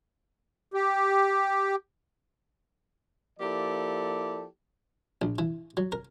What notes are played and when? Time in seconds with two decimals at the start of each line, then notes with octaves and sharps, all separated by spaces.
0.74 G4
3.40 F3 A#3 E4 G4 A4 D5
5.22 A#1
5.38 E3
5.77 F#3
5.92 A#4